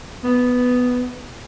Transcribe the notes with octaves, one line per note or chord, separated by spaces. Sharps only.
B3